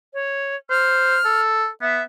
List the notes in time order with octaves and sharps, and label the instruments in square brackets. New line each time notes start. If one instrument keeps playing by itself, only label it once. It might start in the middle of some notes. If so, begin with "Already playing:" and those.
[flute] C#5
[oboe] C5 [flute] F6
[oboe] A4
[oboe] B3 [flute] E5